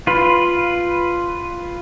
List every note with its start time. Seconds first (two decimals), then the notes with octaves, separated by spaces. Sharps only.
0.07 F4 B4